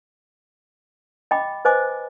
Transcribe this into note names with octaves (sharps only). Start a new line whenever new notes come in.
D#5 G5 B5 D6
B4 C5 D#5 G#5 D6